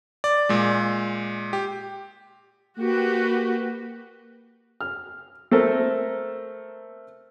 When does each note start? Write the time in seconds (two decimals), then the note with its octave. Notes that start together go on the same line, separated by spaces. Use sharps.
0.24 D5
0.49 A#2 G#3
1.53 G4
2.78 A#3 F#4 G4 B4
4.81 F6
5.52 A3 C4 A4 A#4